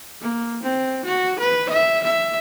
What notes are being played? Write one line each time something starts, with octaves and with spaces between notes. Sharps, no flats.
A#3
C4
F#4
B4
E5
E5